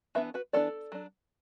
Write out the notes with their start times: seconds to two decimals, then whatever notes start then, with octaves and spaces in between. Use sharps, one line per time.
0.15 E3 B3 D4 B4 E5
0.34 F#4 B4
0.53 E3 B3 D4 A4 D5
0.92 F#3 D4